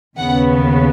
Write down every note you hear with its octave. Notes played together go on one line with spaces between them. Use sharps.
D#2 C#3 B3 F#5